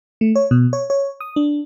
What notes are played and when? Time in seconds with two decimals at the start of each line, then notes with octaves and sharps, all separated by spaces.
0.21 A3
0.35 C#5
0.51 B2
0.73 C#5
0.90 C#5
1.21 D#6
1.36 D4